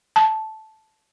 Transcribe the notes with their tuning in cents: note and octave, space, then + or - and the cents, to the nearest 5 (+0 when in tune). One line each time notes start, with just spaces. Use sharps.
A5 -10